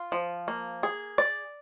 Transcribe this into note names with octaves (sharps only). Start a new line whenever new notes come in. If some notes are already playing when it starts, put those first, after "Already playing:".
Already playing: F4
F3
A#3
G#4
D5